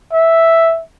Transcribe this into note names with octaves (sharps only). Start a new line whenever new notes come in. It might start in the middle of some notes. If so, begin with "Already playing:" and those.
E5